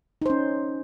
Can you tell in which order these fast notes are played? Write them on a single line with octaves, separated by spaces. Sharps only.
D#4 C5 C#4